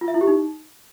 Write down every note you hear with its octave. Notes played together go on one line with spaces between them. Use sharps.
F4
E5
E4
G4
D#4